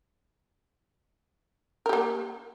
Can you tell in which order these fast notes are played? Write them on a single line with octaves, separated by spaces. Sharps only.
A#4 G4 A#3